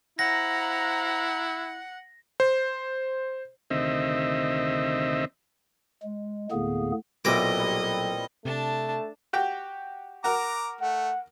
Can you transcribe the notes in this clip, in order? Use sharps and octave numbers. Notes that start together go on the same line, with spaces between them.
E4 C5 F5 F#5 A#5 A#6
C5
D2 C3 D#3 C4 D#5 E5
G#3
D2 A2 D3 A#3 B3 G#4
B1 A#2 B3 C4 E4 D#5 A#5 D6
G3
C3 A3 D4 A5
F#4 G4 G5
F#4 A#4 A#5 D6
A3 F#5